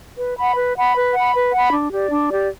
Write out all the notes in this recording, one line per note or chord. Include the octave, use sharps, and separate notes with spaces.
B4
F#5 B5
B4
F#5 B5
B4
F#5 B5
B4
F#5 B5
D4
G4 D5
D4
G4 D5